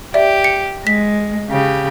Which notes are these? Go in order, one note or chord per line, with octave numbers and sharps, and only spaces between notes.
G4 D5 E5
C#7
G#3 B6
C#3 G4